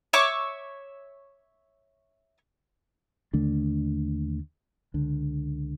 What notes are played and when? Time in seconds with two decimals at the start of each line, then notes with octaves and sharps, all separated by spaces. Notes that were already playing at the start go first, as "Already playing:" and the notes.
0.13 C#5 E5 C#6 D6
3.33 D#2 D3 A3 D4
4.94 C#2 D3